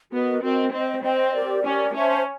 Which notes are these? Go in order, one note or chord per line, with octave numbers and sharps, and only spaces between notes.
B3 F#4 A#4 D#5
C4 F#4 A#4 D#5
C4 C5 D#5 G5
C4 C5 D#5 G5
G4 A#4 D5
C#4 G4 A#4 D5
C#4 C5 E5 A5